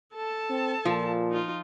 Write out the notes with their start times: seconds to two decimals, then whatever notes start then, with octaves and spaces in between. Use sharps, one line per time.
0.14 A4 A5
0.50 C4
0.85 A#2 F3
1.31 D#4 F4